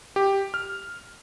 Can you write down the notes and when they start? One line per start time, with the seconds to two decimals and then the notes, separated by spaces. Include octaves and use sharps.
0.16 G4
0.54 F6